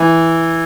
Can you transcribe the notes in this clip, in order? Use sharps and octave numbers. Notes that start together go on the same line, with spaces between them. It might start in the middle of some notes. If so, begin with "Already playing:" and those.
Already playing: E3